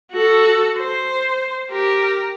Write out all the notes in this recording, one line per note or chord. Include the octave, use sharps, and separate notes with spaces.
F#4 A4
C5
G4 A#4